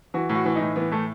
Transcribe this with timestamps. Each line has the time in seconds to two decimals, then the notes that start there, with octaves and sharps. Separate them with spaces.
0.14 E3 F#4
0.29 A2
0.35 F#4
0.45 E3
0.55 D#4
0.61 A2
0.76 E3 B3
0.91 A2 A3